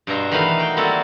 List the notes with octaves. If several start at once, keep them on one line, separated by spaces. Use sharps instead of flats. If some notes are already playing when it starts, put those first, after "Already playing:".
G2 B2 E5 A#5 C6
D#3 E3 A3 D#4 B4 F5
F#4 G5
G3 A#3 C4 E4 F#4 A4